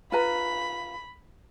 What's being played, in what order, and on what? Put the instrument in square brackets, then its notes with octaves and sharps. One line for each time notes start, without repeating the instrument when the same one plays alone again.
[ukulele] F4 B4 A#5 [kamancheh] B5